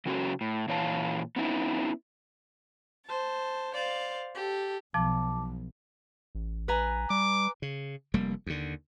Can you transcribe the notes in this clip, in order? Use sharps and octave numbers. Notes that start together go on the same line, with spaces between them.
C#3 F#3 C#4 F#4 A4
A2
A#2 E3 C#5 F5 A5
B3 C#4 D#4 E4
C5 A5
C5 D5 F5
G4 A4
B1 F3 A5 D6
A1
A#1 B4 G#5 A#5
G3 D6
C#3
F1 G3 A#3
D#2 D3